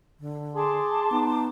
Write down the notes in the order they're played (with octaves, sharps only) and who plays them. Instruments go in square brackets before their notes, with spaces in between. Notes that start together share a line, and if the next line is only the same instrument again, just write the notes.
[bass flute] D3
[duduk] G#4 [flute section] A5 C6 D6
[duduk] B3 [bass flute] D#4